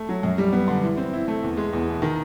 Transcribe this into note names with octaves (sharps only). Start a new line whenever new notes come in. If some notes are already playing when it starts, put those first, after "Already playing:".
Already playing: A3
F#3
F#2
G3
B3
D3
E3
C4
E4
A3
E2
G#3
E2
B2
D#3